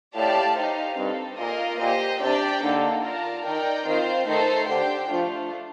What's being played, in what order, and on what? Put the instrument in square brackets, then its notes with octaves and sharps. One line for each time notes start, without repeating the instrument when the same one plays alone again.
[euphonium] A2 [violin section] G4 D5 F5 A5
[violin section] D#4 G4 C5 F5
[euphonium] G2 [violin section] C4 D#4 A4
[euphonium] A#2 [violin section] A#3 F4 A#4 D#5
[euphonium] A#2 [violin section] G4 C5 D#5
[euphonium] C3 [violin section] D4 G4 D5 G5
[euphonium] D3 [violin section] A#3 D#4 A4
[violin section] F4 A#4 D5 A5
[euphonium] D#3 [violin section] D#4 A#4 D5 G5
[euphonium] D#3 [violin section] C4 F4 C5
[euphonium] D#3 [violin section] A3 D#4 A4 C5
[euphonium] D3 [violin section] D4 G4 C5 G5
[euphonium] F3 [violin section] A3 D4 F4